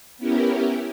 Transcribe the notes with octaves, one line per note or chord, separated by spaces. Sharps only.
B3 C#4 E4 G4 A#4